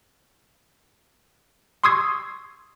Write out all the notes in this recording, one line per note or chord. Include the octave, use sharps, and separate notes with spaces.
C6 C#6 D#6 E6 G#6 C7